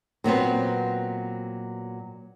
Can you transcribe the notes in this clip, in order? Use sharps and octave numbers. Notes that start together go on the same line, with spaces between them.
A#2 F#3 B3 C4